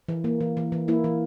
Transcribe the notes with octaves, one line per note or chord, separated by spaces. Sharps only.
E3
A#3
E3
E3
E3
A#3 E4
E3